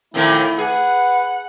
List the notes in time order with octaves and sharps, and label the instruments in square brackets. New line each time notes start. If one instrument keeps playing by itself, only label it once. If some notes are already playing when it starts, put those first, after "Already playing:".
[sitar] F2 A#2 D#3 [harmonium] A3 E4
[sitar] G#4 [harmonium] B4 [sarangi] F#5